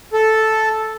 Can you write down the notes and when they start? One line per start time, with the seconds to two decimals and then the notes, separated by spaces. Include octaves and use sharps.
0.13 A4